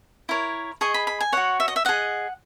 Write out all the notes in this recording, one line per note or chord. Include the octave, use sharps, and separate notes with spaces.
E4 A#4 C#5
G#4 D#5 C#6
B5
B5
G#5
F#4 C#5 F#5
E5
D#5
E5
G#4 D#5 F#5